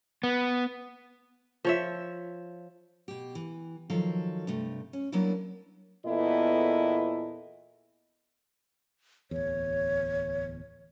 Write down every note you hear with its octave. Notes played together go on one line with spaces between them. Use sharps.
B3
F3 C#5 E5
B2 G4
E3
D#3 F3 F#3 A4 F5
G2 C3 A3
C#4
F#3 G3 A#3 B3 D4 E4
E2 A#2 B3 E4 A4 D#5
D1 E2 C#5